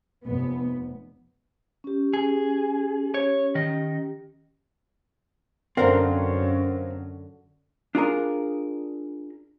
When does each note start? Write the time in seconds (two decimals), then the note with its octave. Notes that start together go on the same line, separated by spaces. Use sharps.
0.25 F1 B3
1.84 C#4 G4
2.14 G#4
3.14 C#5
3.55 D#3 D#5
5.77 F#2 D3 C4 A#4 F5 F#5
7.95 D4 F4 G#4 A#4